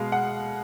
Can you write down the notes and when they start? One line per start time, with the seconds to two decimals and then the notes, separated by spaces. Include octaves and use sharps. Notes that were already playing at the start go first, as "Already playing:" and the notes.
Already playing: B2 G#3 F5
0.12 F#5